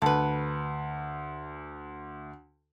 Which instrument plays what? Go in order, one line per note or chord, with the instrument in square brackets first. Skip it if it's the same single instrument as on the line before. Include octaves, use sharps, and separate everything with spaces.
[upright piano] D2 [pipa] A4 B4